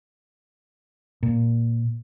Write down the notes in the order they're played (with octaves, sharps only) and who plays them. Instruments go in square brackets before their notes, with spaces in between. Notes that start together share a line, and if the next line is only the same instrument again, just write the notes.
[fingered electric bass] A#2